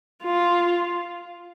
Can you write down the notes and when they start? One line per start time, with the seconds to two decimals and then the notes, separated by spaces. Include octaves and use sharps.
0.23 F4